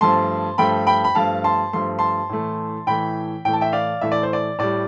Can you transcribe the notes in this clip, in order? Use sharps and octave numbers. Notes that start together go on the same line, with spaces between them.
G2 F3 A3 A5 C6
G2 F3 A3 G5 B5
G5 B5
B5
G2 F3 A3 F5 A5
A5 C6
G2 F3 A3 C6
A5 C6
A2 E3 A3
A2 E3 A3 G5 B5
A2 E3 A3 G5
A5
E5 G5
D5 F5
A2 E3 A3 E5
D5
C5
D5
A2 G3 D5